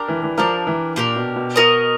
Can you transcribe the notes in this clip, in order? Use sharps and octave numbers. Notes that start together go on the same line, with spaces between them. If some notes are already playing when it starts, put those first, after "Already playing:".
Already playing: D4 G4 A#4
E3
E3
F3 D4 G4 A#4
E3
A#2 D4 G4 A#4
B2
B2
F#4 A#4 D#5